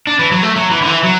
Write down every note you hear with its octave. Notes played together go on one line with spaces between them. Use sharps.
D4
E3
F#3
A3
F#3
E3
D3
E3
F#3